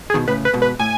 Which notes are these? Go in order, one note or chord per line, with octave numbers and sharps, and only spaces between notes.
G#4
B2 D#3
A2 C#3 B4
B4
G#2 B2
B4
A2 G#5